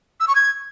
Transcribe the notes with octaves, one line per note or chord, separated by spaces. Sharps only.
E6
C#6
G#6